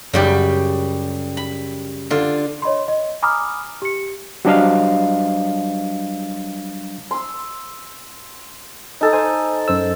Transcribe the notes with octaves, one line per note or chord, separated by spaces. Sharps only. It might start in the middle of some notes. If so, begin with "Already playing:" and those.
F#2 C#3 G3 G4
B5
D3 F4
C#5 D#5 B5 C6
D#5
G#5 A#5 B5 D6 D#6 F6
G4 C#7
F#3 G3 D4 C5 D#5 F5
C6 E6
D#4 A4
C5 G#5
F#2 C5 E6